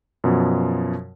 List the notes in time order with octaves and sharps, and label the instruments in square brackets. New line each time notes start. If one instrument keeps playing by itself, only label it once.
[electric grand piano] F#2 B2 F3